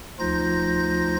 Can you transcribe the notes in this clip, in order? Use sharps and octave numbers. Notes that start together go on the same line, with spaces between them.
D2 F3 D#4 F4 G6 A#6